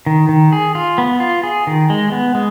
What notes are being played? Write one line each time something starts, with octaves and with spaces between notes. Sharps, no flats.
D#3
D#3
G#4
F4
B3
F4
G#4
D#3
G#3
B3
G#3